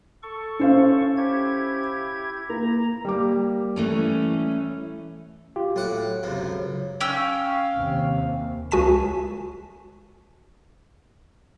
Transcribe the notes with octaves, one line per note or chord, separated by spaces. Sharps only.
A4 C#6
C#4 C5 F5
E4 G4 G#6
A#3 A#5
G3 A#3 D6
E3 A3 C#4
F4 G4
A2 F#3 F#5 D6
C#2 F#2 C3
C#4 F5 G5 E6
D#2 C3
C#2 F#4 G#5 A5 B6 E7